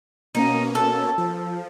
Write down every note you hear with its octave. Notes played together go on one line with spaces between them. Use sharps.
B2 A#3 C#4 D#4
A4
F3